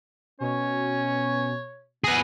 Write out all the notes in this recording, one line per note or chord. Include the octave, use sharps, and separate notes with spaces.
B2 C#4 C#5
B3 G#4 B4 A#6